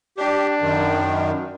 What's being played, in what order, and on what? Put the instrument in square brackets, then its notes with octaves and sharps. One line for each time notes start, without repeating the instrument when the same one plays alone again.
[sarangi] D4 [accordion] G4
[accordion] F#2 D#3